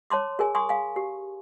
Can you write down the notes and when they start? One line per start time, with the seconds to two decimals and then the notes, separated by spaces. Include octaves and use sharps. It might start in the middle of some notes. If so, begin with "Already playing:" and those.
0.10 C#5 A5 C6 D6
0.39 G#4 A#4 G#5
0.55 G#5 C6 C#6 D#6
0.69 F5 G#5
0.96 G4